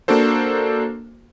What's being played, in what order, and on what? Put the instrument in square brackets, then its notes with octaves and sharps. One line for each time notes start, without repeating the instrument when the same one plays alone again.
[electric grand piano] A#3 D4 F#4 A4 C5